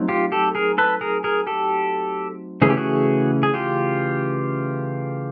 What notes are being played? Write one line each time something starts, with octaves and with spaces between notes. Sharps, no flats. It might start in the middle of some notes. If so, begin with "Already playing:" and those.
Already playing: F#3 A3 C4 D#4
F4 G4
G4 A4
G#4 A#4
A4 B4
G#4 A#4
G#4 A#4
G4 A4
C#3 E3 A3 C#4 G#4
G4
F#4 G#4
G#4
F4 G4